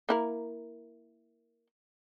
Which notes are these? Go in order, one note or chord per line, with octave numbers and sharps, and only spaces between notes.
A#3 E4 A#4